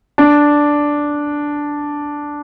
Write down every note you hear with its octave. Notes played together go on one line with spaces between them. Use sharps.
D4